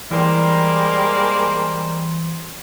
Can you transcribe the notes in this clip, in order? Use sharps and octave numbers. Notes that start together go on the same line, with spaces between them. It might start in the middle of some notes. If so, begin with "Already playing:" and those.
E3 G3 G#3 A#3 C5